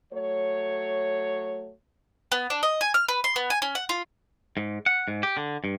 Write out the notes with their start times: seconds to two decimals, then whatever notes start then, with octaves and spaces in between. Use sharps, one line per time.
0.13 F#3 A3 C#5
2.32 B3
2.50 D4
2.63 D#5
2.81 G#5
2.94 F6
3.08 B4
3.24 C6
3.36 B3
3.50 G#5
3.62 C#4
3.75 F#5
3.89 F4
4.57 G#2
4.86 F#5
5.08 G#2
5.23 G4
5.37 D3
5.64 G2